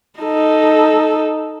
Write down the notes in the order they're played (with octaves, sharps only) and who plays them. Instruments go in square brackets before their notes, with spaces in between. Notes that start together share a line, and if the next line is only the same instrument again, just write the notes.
[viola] D#4 A4